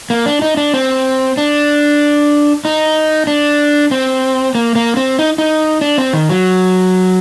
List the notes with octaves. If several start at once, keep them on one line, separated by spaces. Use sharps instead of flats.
A#3
D4
D#4
D4
C4
D4
D#4
D4
C4
A#3
A#3
C4
D#4
D#4
D4
C4
D#3
F#3